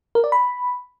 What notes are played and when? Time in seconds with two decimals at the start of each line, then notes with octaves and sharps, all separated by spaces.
0.15 A#4
0.24 D5
0.32 B5